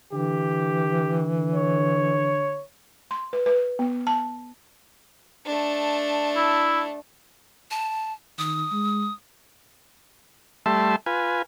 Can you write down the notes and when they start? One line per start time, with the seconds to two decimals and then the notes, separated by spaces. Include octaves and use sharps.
0.13 D3 E3 G4
1.55 C#5
3.11 C6
3.33 B4
3.46 B4
3.79 B3
4.07 A5
5.46 A3 D4
6.36 E4
7.71 A5
8.39 D#3 D#6
8.72 G#3
10.66 G3 A3 E5 A5 C6
11.06 F4 B4 G#5